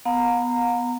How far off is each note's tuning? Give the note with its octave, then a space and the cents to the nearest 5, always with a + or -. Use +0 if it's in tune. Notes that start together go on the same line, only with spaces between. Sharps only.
B3 +0 F5 +45 A#5 -20